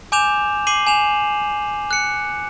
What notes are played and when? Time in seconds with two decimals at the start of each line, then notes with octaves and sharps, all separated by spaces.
0.12 G#5 D6 G6 E7 F7
0.67 D6 C7 D#7 F#7
0.87 G#5 E7 F7
1.91 F#6 C#7